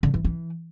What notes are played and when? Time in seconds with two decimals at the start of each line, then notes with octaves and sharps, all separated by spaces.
0.03 D3
0.14 E3
0.24 E3